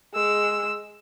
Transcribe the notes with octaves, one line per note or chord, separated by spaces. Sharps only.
G#3 E6